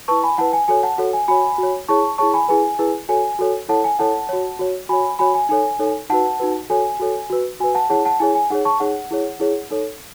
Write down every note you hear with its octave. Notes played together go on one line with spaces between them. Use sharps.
E4 B4 A5 C#6
G#5 B5
E4 B4 F#5 A5
G#5
F#4 A4 C#5 G#5
F#5 A5
F#4 A4 C#5 F#5
G#5
F#4 C#5 G#5 B5
F#4 C#5
E4 G#4 C#5 A5 C#6
E4 G#4 C#5 A5 C#6
G#5 B5
E4 G#4 B4 G#5
E4 G#4 B4
F#4 A4 C#5 G#5
F#4 A4 C#5
E4 A4 C#5 F#5 A5
G#5
E4 A4 C#5 F#5 A5
F#4 C#5
F#4 C#5
F#4 C#5 G#5 B5
F#4 C#5 G#5 B5
G#5
D#4 A4 C#5 G#5
D#4 A4 C#5
D#4 F#4 B4 F#5 A5
D#4 F#4 B4
F#4 A4 C#5 G#5
F#4 A4 C#5
F#4 B4
F#4 B4 G#5
F#5 A5
E4 G#4 C#5 F#5 A5
F#5 A5
E4 G#4 C#5 G#5
G#5
D#4 G#4 C#5 F#5
A5 C#6
D#4 G#4 C#5 F#5
E4 G#4 C#5
E4 G#4 C#5
D#4 A4 C#5